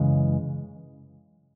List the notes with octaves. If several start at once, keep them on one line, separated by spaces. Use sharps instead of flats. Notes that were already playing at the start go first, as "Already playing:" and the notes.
Already playing: F#2 C#3 E3 G#3